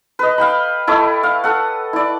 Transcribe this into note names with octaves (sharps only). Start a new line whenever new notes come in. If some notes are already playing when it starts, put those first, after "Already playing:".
B4 D#5
F5 G5 B5
E4 A4 C#5 D#5
F5
A4 F#5
E4 D5